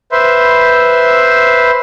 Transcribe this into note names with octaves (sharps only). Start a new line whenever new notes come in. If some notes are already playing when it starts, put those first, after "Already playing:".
B4 C5 E5 C6